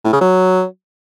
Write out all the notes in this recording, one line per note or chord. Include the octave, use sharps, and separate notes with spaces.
A2
C#3
F#3